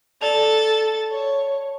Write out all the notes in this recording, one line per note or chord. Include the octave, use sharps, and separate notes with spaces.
A4 D5 A5 A6 F7
C#5